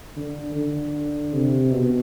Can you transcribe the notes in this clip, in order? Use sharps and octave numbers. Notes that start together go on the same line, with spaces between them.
D3
D3
C3
B2